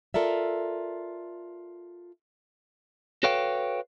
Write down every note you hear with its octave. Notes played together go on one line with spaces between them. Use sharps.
F4 A4 A#4 D5 E5
F#4 A4 B4 C#5 F5 G5